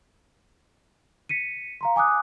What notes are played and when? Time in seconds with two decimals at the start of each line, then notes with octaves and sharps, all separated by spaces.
1.29 B6 C#7 D#7
1.81 F5 A#5 C6
1.96 G#5 D6 D#6 F#6